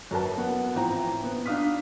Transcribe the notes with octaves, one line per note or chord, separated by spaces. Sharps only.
F#2 A#4 B4 A5
B3 F#5
A1 F3 C4 A#5
B3
D4 D#4 F5 D#6 F6 B6